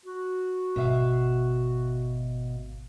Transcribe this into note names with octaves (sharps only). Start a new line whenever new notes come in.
F#4
G#1 B2 E5 F5